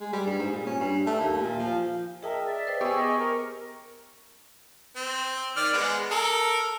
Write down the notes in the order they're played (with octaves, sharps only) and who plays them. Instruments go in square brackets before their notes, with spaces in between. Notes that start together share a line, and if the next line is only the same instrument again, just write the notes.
[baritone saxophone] G#3
G3
G2
G#2
A#2
C#4
G2
A3
D#2
A#2
F3
[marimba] G#4 G5 A5 [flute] A#4 [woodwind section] D#5 E5
[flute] D5
[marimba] B4 C5 G5
[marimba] B3 [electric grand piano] G4 G#4 [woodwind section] C#6 [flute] E6
[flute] D#5
A#4
[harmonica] C4
D#3 D5 F6
G#3 B3
A4 A#4